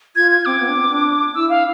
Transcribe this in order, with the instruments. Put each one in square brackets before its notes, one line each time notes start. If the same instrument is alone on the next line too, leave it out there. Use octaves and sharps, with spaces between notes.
[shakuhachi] F4 [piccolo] G#6
[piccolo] G#6
[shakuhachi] C4 [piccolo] D6
[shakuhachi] B3
D4
C4
D4
[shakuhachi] E4 [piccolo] E6
[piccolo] F5